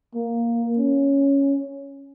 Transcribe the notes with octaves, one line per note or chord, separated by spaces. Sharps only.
A#3
C#4